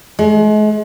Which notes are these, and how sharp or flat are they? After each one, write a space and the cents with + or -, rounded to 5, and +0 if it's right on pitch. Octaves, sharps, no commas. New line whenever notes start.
G#3 +40